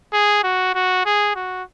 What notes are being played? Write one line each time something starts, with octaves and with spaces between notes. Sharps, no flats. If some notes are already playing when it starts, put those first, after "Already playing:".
G#4
F#4
F#4
G#4
F#4